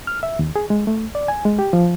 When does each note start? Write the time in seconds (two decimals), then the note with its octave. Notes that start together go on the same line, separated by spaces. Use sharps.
0.07 F6
0.23 E5
0.39 D#2
0.56 G#4
0.70 G#3
0.87 A3
1.15 D5
1.28 G#5
1.45 G#3
1.59 G4
1.73 F3